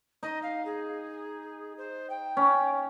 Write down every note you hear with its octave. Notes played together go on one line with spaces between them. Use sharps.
D#4 D#5
F5
G#4
C5
G5
C#4